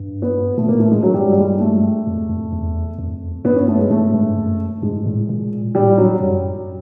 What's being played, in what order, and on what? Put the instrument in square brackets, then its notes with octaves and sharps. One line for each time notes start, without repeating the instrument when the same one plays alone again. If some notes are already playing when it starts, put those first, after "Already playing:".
Already playing: [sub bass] G2
[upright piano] B3
[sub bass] A#2 [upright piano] A3
[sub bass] A2 [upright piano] A#3
[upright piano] A3
G#3
F#3
[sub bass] G2 [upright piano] G3
[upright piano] G3
G#3
A3
[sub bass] F2
F2
E2
F2
[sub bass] G2 [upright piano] B3
[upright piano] C#4
A3
G#3
[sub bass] G#2 [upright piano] A3
[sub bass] G2
F#2
[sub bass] G#2 [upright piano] G#3
[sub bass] A2
A#2
[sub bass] A2 [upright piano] G3
[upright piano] F#3
[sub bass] F#2